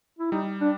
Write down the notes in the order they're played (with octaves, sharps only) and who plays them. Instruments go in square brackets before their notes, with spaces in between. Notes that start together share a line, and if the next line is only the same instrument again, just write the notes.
[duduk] E4
[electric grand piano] G3 [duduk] D#4
[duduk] D4